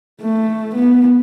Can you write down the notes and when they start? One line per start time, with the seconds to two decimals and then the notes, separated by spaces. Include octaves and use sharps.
0.21 A3
0.75 B3